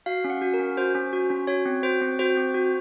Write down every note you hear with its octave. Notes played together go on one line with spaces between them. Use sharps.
F#4 F5
C#4
F#5
F#4
A#4
C#4
F#4 C5
C#4
F#4
C#4
F#4 C#5
C4
F#4 C5
C4
F#4 C5
C4
F#4